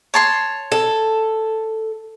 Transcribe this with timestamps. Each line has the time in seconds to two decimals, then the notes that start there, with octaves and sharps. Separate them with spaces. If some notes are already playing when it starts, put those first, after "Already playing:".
0.14 C#5 A5 C6
0.72 A4